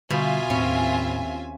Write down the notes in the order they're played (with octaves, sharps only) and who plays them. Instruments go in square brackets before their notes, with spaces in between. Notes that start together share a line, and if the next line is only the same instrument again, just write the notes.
[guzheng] B2 [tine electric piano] D3 G3 G6 [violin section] F4 E5 G#5
[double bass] D#2 C4 [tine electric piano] A2 B5 [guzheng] C#4